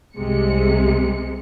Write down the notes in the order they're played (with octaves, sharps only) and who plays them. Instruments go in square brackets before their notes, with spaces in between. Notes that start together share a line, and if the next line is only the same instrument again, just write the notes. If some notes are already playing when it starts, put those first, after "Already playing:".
[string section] C2 C3 G#3 C#7